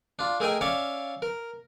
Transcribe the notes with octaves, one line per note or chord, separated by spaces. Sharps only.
D4 F4
A3 G#4 A#4 D#5 G5 G#5
C#4 C#5 D5 E5 F5
A#4